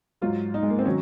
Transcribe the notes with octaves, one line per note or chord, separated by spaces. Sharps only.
G#2 F#3 F4
D#4
G#3
A#3
C4
D#3 F#3 C#4